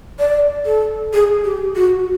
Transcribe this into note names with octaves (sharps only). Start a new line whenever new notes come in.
D5
A4
G#4
G4
F#4